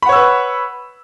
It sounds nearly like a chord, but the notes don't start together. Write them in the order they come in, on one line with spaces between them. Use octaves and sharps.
B5 F#5 C#5 E6 B4